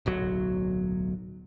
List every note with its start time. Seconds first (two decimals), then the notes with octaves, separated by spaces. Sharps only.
0.06 D1 B1 F#3